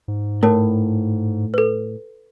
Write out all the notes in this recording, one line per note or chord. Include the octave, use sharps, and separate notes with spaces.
G#2
A2 A#4 C#5 A5
A4 B4